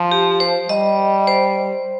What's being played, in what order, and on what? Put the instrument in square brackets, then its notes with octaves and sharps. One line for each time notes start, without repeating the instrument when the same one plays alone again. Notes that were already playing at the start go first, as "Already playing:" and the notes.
Already playing: [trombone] F3
[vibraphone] G4
C5
[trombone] G3 [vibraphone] D#5
[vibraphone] C5